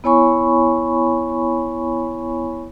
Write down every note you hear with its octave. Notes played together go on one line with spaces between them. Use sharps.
B3 E4 C#5 G#5 B5 C#6